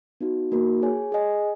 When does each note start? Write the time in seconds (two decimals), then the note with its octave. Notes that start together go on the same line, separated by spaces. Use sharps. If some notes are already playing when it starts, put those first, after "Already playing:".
0.21 B3 D#4 F#4
0.51 A#3 D#4 F#4 A#4
0.82 G#4 C#5 G#5
1.12 G#4 D#5 G#5